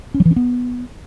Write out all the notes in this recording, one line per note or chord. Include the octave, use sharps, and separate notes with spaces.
C#4
F#3
E3
C#4
B3